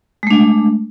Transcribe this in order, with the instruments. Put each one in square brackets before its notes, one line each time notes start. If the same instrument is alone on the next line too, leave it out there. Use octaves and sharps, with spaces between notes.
[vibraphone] G#3
A3
D4